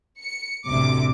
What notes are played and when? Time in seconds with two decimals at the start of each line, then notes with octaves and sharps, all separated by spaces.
0.20 C#7
0.67 A1 D2 C3 D6